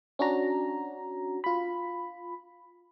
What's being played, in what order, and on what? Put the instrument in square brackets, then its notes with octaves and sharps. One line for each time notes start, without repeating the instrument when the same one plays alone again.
[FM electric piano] C#4 D4 F#4 A#5
F4 B5